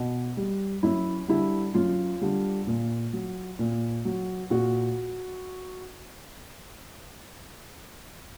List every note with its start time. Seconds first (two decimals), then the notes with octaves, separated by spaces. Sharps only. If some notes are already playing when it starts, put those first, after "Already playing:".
Already playing: B2
0.37 G3
0.83 F#2 E4
1.28 D3 G3 E4
1.74 F#2 F4
2.21 D3 G3
2.67 A#2
3.13 F#3
3.59 A#2
4.05 F#3
4.50 A#2 F#4